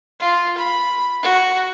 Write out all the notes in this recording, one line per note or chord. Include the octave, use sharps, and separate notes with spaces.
F4
B5
F#4